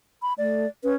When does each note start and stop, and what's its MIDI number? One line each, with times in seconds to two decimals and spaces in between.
0.22 0.34 83
0.38 0.66 57
0.38 0.68 74
0.84 0.96 61
0.84 0.94 71